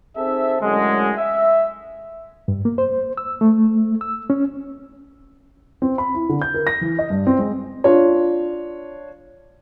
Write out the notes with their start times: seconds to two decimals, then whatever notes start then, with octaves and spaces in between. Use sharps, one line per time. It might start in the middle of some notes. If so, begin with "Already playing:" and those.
0.17 C4 D#4 G#4 A4 E5
0.62 F#2 A2 D3 G#3
1.18 E5
2.48 G2
2.65 A#3
2.78 C5
3.17 E6
3.41 A3
4.01 E6
4.30 C#4
5.82 C4
5.98 B5
6.14 E4
6.29 D3
6.42 G6
6.54 A#4
6.67 A#6
6.81 E3
6.99 D#5
7.10 G2
7.27 C4
7.39 G#3
7.84 D4 F4 C#5